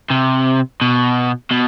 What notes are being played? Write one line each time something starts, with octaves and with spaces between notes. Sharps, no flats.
C3
B2
B2